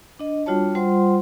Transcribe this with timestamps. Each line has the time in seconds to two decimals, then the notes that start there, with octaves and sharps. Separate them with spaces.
0.19 D4 D#5
0.46 G3 D4 F4 F#4 C#5 A5
0.75 G3 F4 C5 F#5 C6